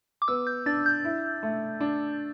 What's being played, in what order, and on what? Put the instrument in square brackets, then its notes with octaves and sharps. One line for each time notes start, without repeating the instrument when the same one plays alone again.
[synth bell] D6
[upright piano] B3 [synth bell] E6
[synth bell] G6
[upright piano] D4 [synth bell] A6
[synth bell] G6
[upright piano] E4
A3
D4